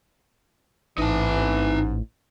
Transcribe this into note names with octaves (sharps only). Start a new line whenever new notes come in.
A1 G#2 E3 D#4 A5